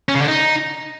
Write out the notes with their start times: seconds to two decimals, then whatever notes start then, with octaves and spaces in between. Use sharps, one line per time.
0.09 C#4
0.15 C#3
0.22 D3
0.28 D#4